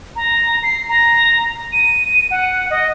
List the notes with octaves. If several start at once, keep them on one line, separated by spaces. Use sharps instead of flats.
A#5
C7
A#5
D#7
F#5
D#5